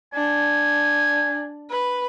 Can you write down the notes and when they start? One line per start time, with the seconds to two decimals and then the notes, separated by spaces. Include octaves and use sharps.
0.14 D4 G#5
1.70 B4